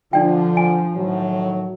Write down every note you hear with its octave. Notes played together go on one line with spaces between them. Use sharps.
D3 F3 D4 F4 D5 G5
G#5
A2 D#3 F#3